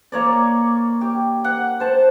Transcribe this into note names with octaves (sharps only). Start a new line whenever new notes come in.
A#3 C#5 D5
G4
F#5
C5 A5